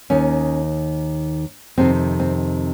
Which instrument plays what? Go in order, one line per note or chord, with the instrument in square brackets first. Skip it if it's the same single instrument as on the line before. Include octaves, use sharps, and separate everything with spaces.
[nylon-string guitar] D#2 D#3 C#4
F2 C3 D#3 C4
C4